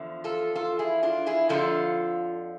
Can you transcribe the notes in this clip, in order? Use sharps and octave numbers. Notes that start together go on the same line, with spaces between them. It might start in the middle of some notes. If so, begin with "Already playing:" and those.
Already playing: E2 D3 F3
F4 A4
F4 A4
E4 G#4
D4 F4
E4 G#4
F2 D3 F3 F4 A4